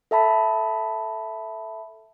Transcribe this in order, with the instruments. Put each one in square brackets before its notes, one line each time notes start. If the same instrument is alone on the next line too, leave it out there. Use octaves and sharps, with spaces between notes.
[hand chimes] A4 E5 A5 B5 B6